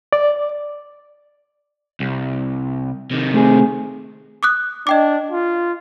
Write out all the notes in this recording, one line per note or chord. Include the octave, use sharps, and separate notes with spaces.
D5
C2
C3 D#3
A3 C4 G#4
D6 D#6 F#6
D4 D#5 G5 D6
F4